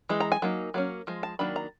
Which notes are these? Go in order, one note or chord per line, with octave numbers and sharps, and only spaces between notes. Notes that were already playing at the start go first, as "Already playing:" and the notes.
E3 G#3
A#5
G#5
F#3 A#3 D#4
F#3 A#3 C#4
F3 G#3
A5
D#3 F#3 A#3 D4 B5
A#5